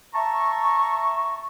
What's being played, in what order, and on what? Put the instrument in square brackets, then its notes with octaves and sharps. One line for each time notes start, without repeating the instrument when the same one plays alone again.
[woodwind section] E5 A5 A#5 C#6